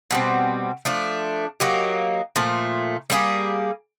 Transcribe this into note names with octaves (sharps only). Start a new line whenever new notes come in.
B2 G3 C4
F3 A3 D4
F#3 A#3 D#4 G4
A#2 F3 A3
G3 A#3 D#4 G#4